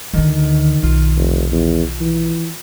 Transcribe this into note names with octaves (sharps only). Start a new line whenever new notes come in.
D2 D3 D#3
B1 F4
F1
E2
E3